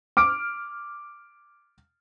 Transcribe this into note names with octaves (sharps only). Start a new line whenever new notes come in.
D6 F6 D7